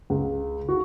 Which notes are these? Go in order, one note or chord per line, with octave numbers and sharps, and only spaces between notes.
C#2
F#4